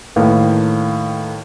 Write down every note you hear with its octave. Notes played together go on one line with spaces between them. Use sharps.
A2 D#3 A#3 B4 F5